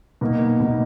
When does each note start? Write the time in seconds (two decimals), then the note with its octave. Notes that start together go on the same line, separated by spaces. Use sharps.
0.21 B2 A#3 D#4
0.60 B2 A#3 D#4